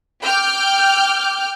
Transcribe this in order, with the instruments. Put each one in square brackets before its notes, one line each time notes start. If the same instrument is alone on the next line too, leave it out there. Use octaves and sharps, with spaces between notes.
[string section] G5 D6 F6 G6